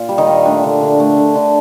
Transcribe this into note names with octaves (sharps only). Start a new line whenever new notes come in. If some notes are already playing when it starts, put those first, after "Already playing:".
Already playing: A#2
G3
D#3 D#4
A#2
A3 D4
D3
D3
A3
D3
D3